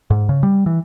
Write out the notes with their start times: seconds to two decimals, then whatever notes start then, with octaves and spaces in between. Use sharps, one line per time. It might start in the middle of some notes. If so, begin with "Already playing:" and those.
0.10 G#2
0.29 C#3
0.43 G3
0.66 E3